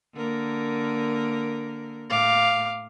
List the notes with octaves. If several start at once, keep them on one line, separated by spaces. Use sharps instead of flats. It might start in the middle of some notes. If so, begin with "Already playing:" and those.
D3 A#3 A#4
A2 F5 D6